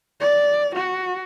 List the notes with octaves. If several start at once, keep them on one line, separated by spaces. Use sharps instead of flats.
D5
F#4